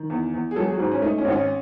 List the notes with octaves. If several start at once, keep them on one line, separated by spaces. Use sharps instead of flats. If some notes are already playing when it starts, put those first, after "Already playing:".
Already playing: D#3
E2
E2
G#4
F#3 A4
F#4
G#4
F#4
G#2 G#4
C#4
A3 D#4
C#4
G#1 D#4
C#4